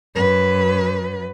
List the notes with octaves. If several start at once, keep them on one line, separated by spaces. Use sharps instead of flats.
F#2 B4